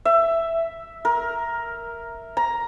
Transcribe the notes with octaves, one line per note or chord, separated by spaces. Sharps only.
E5
A#4
A#5